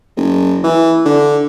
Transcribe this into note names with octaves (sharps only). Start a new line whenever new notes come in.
F#1
E3
D3